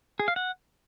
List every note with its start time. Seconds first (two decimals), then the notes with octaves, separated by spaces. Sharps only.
0.19 G#4
0.28 F5
0.36 F#5